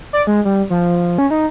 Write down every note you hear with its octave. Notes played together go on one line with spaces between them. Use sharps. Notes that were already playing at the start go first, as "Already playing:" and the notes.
D5
G#3
G3
F3
F3
C#4
D#4